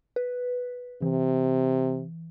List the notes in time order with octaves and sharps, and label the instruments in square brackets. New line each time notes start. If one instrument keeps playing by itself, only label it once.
[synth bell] B4
[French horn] C3 [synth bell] E3